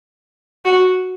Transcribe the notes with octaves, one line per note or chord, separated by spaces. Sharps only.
F#4